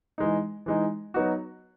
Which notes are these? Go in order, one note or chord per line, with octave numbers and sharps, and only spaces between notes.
E3 G#3 D#4
E3 G#3 D#4
F#3 B3 D#4 F#4